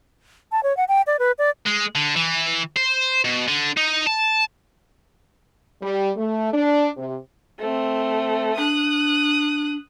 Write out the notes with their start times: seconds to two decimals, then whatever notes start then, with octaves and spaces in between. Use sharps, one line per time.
0.52 A5
0.63 C#5
0.77 F#5
0.88 G5
1.07 D5
1.19 B4
1.38 D5
1.66 G#3
1.95 D3
2.16 E3
2.77 C5
3.25 B2
3.48 D3
3.77 D#4
4.07 A5
5.82 G3
6.17 A3
6.53 D4
6.97 C3
7.59 A3 C4
8.57 D4 D#6 F#6